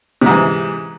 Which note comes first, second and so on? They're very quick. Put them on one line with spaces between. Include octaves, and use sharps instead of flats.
C3 G#2 E3